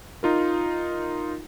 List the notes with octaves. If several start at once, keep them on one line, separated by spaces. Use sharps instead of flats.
D#4 F4 A#4